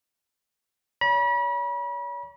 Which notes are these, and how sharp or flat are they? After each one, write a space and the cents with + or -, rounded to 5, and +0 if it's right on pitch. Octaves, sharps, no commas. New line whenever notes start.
C#5 +40 B5 -40